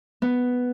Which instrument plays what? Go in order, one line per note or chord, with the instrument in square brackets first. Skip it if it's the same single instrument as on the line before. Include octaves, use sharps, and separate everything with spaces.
[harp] B3